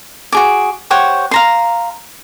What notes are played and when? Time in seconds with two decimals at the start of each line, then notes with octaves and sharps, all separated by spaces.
0.32 F#4 G#4 D6
0.90 G4 C5 C#5 F#5
1.31 F5 A#5 C6